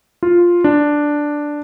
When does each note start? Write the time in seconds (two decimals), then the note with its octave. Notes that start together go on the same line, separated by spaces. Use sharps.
0.23 F4
0.64 D4